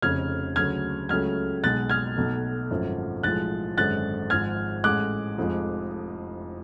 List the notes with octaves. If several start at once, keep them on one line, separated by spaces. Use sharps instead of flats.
F1 F2 C#3 F6 G#6
D2 C#3 F#3 F6 G#6
C#2 C#3 F#3 A3 F6 G#6
B1 B2 G#3 F#6 A6
F6 G#6
B1 B2 A3
G#1 F#2 F3 A3
B1 A2 F3 G#3 F#6 A6
G#1 F#2 D3 G#3 F#6 A6
G#1 G#2 F3 G#3 F6 G#6
A1 A2 G#3 D6 F#6
F1 F2 F3 G#3